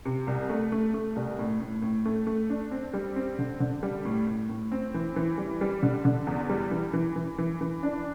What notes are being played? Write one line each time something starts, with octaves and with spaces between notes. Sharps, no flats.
C3
C2
A3
A3
A3
C2
A2
A2
A2
A3
A3
D4
C4
G3
C4
D3
D3
G3
A2
A2
A2
C4
E3
E3
G3
G3
D3
D3
E2
G3
E3
E3
E3
E3
E3
D4